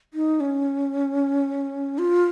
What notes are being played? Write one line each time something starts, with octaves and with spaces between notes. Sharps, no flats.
D#4
C#4
F4